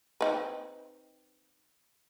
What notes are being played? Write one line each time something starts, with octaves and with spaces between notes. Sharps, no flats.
C4 D#4 B4